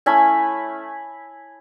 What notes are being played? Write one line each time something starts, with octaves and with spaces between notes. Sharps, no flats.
A3 C#4 E4 G#5 B5